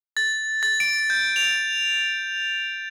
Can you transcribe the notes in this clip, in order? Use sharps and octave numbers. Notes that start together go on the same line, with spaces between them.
A6
A6
D7
G6
F7